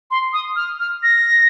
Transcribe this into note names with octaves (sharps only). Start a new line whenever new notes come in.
C6
D#6
F6
F6
A#6